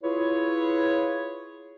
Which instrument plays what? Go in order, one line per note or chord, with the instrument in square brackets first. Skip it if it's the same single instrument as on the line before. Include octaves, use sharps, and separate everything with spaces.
[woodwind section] E4 F4 G#4 B4 C#5